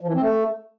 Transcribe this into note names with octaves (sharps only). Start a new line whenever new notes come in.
F3
E3
C4
A3